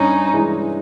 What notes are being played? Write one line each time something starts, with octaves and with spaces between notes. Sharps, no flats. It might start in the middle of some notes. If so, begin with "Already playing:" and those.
Already playing: G2 C#4 D#4
E3 G#3